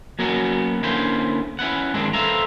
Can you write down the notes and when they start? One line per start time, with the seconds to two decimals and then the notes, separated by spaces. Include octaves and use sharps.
0.19 F#3 A#3 B3 C#4 F#4
0.83 D3 A#3 C#4 E4 B4 C5
1.59 C#4 E4 B4 F#5
1.94 G#2 D#3 E3 G#3 C4 D4
2.14 A4 B4 C5 E5 F5 A#5